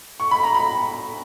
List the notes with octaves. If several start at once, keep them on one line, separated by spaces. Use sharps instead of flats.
C#6
B5
A#5
B5